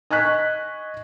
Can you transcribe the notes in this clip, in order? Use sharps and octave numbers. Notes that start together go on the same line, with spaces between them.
D#5 G#5 C#6 F#6 B6